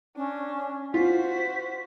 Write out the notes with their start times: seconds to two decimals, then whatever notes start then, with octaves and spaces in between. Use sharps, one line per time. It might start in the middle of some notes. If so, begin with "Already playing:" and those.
0.16 C#4 D4
0.94 F4 F#4 C5 B6